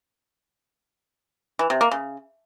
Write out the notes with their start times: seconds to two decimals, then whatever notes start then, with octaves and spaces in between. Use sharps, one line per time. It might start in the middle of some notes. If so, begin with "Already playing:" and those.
1.59 E3
1.70 C3
1.81 A#3
1.91 C#3